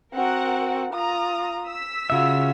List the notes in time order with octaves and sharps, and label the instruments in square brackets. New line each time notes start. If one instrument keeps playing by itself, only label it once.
[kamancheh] C4 F#4 [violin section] A#4 F#5
[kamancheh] F4 D#6 [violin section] A#5
[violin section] E6 B6
[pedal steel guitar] C#3 E5 [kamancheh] F4 F#4